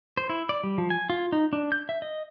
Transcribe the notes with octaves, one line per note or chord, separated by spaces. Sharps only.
C5
E4
D5
G3
F3
G#5
F4
D#4
D4
G6
E5
D#5